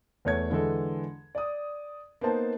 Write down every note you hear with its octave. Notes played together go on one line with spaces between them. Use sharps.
E2 A3 C#5 G#6
D3 E3 G#3 A4
D5 D#6
A#3 B3 D#4 C5 A5